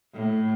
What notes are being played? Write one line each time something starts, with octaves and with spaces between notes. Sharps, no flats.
A2